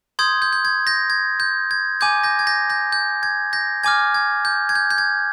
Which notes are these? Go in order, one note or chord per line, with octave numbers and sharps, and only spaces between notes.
C6 D#6 G6 G#6
G6
G6
G#6
G6 A#6
G#6
G6
G#6
G#5 D6 G6 G#6
G6 A#6
G#6
G6 A#6
G6 A#6
G6
G#6
G6 A#6
G#5 D6 F6 G#6
G#6
G6
G#6
G6
G6
G#6